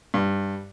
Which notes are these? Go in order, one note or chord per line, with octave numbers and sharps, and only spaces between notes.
G2